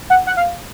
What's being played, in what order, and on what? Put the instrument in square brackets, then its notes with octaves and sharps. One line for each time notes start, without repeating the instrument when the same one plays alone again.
[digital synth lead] F#5
F#5
F5